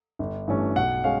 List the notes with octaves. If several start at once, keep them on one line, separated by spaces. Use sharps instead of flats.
G1
G2 E3 A3 C#4
B1 F#5
G#3 C#4 F5